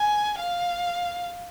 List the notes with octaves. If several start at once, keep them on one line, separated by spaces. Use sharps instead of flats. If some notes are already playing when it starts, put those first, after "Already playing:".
Already playing: G#5
F5